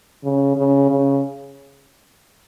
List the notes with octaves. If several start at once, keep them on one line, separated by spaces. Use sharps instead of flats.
C#3
C#3
C#3